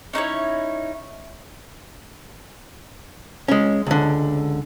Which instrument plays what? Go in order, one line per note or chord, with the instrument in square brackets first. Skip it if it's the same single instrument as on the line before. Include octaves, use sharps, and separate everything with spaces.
[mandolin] C#4 D#4 E4 C#5
[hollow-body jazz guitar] G#3 C#4
C#2 D3